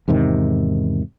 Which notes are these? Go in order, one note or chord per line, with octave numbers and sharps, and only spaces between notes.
E2 G#2 C3 D#3